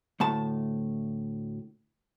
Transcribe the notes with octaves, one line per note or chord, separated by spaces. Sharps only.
D2 A2 A5